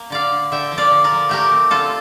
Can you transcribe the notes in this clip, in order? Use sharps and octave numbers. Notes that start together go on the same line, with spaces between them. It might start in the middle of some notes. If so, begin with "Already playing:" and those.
Already playing: A#3
D3 D5 F5
D3
D3 E5 G5
F3
D5 F5
D3
A#4 D5
F3
A3 G4 A#4
C4
D3 F4 A4